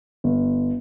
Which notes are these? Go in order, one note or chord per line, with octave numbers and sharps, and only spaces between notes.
G1